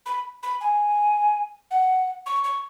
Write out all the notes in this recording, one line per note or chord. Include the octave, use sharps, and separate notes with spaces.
B5
B5
G#5
F#5
C#6
C#6